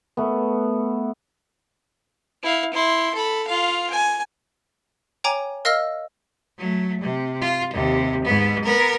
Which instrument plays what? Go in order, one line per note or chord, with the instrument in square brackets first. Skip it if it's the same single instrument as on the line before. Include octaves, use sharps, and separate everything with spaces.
[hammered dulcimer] A3 B3
[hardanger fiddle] E4 F5
E4 C6
A4 B5
F4 F5
G#5
[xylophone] C#5 G5 G#5 A#5 D6
A#4 D#5 F5 E6 F6 A#6
[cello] F#3 A3
C3
F4
D#2 C3
G#2 B3
B3 A#4